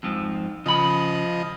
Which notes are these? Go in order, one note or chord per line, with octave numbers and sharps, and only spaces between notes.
F2 G#2 F3
C#3 F3 D#5 B5